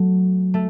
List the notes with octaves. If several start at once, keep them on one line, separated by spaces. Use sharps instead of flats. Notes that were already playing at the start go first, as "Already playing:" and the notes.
Already playing: F#3 A3
A3